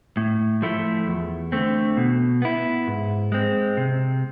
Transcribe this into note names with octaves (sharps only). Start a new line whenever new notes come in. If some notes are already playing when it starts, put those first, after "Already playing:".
A2
F3 A3 E4
E2
D3 A3 C4
B2
B3 E4
G#2
G#3 C4
C3